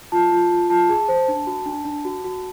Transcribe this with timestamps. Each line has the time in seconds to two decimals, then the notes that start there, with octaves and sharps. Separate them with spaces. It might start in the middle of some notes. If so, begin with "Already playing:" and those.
0.12 F4 A5
0.32 F4
0.51 F4
0.70 F4 A5
0.89 G#4
1.08 C5
1.28 D4
1.47 F#4
1.66 D4
1.85 D4
2.05 F#4
2.24 F#4